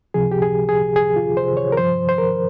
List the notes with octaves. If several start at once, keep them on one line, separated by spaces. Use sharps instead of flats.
C#2 C3 F3 G#4
G4
G#4
G#4
G#4
F4
C5
C#5
A#4
G2 F3 C5
C5
A#4